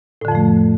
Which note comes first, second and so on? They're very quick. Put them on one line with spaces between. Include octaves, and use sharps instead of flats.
A2 D3 F2 F3 A3